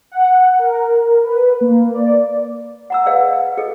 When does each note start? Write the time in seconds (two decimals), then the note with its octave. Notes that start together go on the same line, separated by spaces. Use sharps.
0.12 F#5
0.59 A#4
1.24 B4
1.61 A#3
1.94 D5
2.90 F#5 A#5 E6
3.06 G#4 B4 D5 D#5 F5
3.58 G#4 A4 D#5